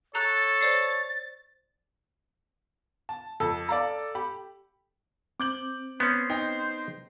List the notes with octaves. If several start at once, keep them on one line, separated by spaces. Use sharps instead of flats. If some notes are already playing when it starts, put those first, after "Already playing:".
A4 C#5 A#5 E6 F#6 A6
C5 D5 C7
A5
F2 A4
D5 F5 A#5
G4 B5
C4 D6 G6 F#7
B3 C#4 C5
D#4 G5